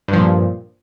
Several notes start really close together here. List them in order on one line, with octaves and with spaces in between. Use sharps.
G2 F3 A#2